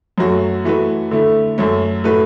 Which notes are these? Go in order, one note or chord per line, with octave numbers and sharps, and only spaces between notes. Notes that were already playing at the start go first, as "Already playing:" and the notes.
F#2 F#3 A3 F#4
E3 A3 F#4 B4
D3 A3 E4
F#2 F#3 A3
A2 A3 F#4 B4